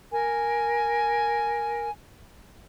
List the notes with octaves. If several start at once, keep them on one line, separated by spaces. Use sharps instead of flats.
A#4 G#5